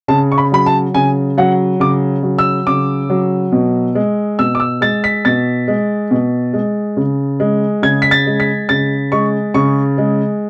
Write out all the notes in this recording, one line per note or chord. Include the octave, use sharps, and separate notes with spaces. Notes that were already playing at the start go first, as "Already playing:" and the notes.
C#3 A5
C#6
B5
F#3 B5
A5
C#3 G#5
F#3 F#5
C#3 D6
F#3
E6
C#3 D6
F#3
B2
G#3
B2 E6
D6
E6
G#3 A6
B6
B2 A6
G#3
B2
G#3
C#3
G#3
C#3 G#6
B6
A6
G#3
B6
C#3 A6
G#3 C#6
C#3 C#6
G#3